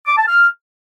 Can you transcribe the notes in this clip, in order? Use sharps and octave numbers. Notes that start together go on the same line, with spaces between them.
D6
A5
F6